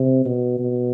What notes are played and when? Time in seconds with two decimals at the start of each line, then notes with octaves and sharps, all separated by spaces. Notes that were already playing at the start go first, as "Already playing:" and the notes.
Already playing: C3
0.25 B2
0.59 B2